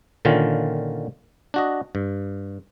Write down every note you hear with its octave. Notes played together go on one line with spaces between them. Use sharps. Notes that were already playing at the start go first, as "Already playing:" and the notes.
A#2 D3 D#3 C#4 F4
D4 F#4 D#5
G2